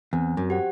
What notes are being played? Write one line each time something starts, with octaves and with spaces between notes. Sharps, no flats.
E2 C4
F#2
G4 C5 F#5